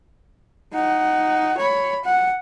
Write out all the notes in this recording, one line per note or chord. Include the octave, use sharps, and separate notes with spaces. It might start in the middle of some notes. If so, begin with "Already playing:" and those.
D#4 F#5
C#5 B5
F#5